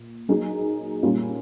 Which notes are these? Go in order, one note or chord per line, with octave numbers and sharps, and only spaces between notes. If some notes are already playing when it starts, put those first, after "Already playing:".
Already playing: A#2
F#3 A#3 D#4 G#4
A#2 G3 A#3 C#4 F4